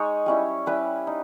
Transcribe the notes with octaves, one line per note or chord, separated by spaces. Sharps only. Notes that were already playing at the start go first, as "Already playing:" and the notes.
Already playing: G#3 D#4 C#5 D#5
G3 C#4 E4
G3 C#4 E4 B4
D#4